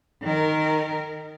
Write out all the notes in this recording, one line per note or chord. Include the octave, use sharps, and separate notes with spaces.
D#3 A#4